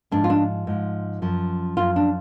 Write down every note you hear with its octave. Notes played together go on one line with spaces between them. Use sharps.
G#2 F3 D4
F4
D4
G#2 F3
F#2 F3
F#2 F3 F4
D4